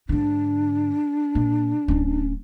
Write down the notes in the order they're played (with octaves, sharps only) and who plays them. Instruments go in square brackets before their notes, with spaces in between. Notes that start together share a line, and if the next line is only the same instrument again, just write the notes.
[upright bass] G#2 D3 [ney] D4
[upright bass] A#2
D1 C#4